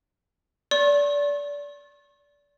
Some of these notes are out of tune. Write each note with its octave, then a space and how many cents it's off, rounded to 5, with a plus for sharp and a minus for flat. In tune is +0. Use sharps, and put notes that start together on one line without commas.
D5 -25 C#6 -45